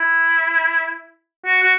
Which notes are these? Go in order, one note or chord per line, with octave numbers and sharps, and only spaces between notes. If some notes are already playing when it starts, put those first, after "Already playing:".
Already playing: E4
F#4
F#4